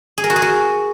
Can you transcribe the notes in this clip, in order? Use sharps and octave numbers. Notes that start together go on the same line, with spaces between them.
G#4
A#4
F#4
G#4
F#4